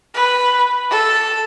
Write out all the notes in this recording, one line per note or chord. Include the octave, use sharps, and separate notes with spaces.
B4
A4